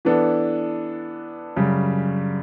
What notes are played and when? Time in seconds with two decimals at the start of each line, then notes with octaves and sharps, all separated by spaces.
0.05 E3 B3 D4 A4
1.57 F#2 C#3 G3